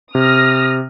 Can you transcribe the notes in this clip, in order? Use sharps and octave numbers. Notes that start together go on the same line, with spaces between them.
C3 D#6 F6 A#6